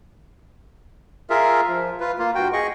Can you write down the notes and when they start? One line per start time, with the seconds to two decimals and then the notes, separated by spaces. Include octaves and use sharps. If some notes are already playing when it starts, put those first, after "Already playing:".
1.30 F4 G#4 A#4 E5
1.68 F3
2.00 F4 B4
2.19 A#3 F4
2.35 G2 F#4 G5
2.53 G#4 D#5 C#6